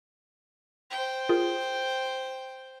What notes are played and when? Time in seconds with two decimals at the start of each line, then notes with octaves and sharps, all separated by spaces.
0.91 C5 G5
1.29 F4 G#4 A#4